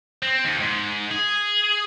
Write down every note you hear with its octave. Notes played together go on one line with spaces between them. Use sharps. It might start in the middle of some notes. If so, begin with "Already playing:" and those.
C4
D#2
G#2
G#4